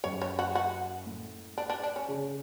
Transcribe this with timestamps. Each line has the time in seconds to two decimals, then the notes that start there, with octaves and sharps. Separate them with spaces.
0.04 F#2 C#5
0.22 C#5
0.39 F#4
0.55 F#4
1.06 A2
1.58 D4
1.70 D4
1.83 D4
1.96 C#4
2.08 C#3